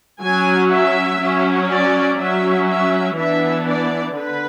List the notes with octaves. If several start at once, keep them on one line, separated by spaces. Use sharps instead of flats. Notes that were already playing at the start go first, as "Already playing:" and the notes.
F#3 C#4 G#5
E5
F#3 C#4
D5
F#3 C#4 E5
E5
E3 B3 D4 E5
D5
D3 B4